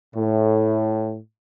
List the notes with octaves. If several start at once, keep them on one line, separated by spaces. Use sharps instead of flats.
A2